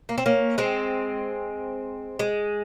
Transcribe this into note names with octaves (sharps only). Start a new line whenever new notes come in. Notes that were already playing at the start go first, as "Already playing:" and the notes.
A#3
C4
A#3 C#4
G#3 C4
G#3